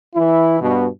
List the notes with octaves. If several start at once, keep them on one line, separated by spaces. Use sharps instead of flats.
E3 E4
G2 B2